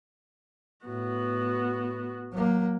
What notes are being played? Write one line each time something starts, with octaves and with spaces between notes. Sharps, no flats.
A2 B3 F#4
F#3 A#3